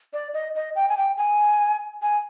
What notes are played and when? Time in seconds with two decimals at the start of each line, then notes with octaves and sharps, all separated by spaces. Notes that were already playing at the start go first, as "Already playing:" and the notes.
0.13 D5
0.34 D#5
0.55 D#5
0.75 G5
0.89 G#5
0.97 G5
1.18 G#5
2.02 G#5